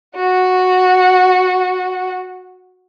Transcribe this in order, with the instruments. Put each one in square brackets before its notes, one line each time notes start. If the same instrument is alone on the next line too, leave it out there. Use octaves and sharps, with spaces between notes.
[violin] F#4 F#5